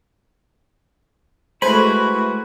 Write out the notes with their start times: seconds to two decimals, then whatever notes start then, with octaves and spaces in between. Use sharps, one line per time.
1.62 G#3 A3 E4 F#4 B4 C5 G#5 B5